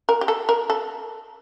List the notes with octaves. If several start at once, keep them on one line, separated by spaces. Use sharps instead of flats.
A#4
G4
A4
A#4
A4